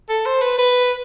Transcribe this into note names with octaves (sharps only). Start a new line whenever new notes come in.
A4
C5
B4
B4